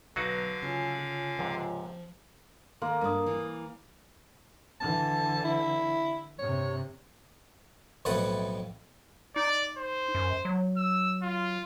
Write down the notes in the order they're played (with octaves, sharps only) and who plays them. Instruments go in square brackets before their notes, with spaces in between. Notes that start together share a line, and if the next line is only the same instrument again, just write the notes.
[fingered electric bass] B1 [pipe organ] D3 F5 [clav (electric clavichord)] F#3 D#4 F#4 [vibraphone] B4 A#5
[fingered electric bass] C#3 [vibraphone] F4 C#5 G#5
[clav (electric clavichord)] C#2 G#2 C3 [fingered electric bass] F3
[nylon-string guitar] D#3 [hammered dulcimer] A#3 [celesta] C6
[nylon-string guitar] G2 D4 [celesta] A#4 D#6
[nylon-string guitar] E3
[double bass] D3 E3 [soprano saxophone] A5
[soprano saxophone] E4
[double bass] G2 C3 [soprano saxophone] C#5
[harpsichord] B1 F2 A2 A4 B4 F#5
[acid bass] D#4 [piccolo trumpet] D5
[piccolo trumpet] C5
[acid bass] F#2
F#3
[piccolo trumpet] E6
F4